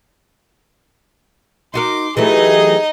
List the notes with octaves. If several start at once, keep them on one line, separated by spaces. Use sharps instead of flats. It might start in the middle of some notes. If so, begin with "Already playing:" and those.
D#4 F#4 A#4 C6 D6
E3 F#3 A3 D#4 G4 G#4 D#5